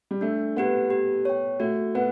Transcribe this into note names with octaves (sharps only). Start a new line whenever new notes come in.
G3
A3 D4
B3 G4 B4 F#5
G4
C#5 G5
A3 F#4
B3 B4 F#5